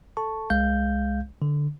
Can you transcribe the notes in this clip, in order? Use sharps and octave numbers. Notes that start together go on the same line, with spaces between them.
A4 A5 C#6
C2 G#3 F5 G6
D3